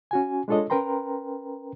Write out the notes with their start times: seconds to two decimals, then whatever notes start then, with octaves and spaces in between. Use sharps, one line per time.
0.11 C#4 F#4 G#5
0.48 G#3 D4 F4 A4 C#5 D#5
0.70 C#4 A#4 B4 G5 A#5 C6